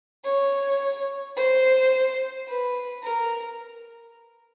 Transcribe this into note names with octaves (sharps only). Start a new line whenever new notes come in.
C#5
C5
B4
A#4